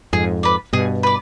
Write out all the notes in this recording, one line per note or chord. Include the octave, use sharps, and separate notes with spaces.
F2 G#2 G#4
B4 D5
G2 B2 G#4
B4 D5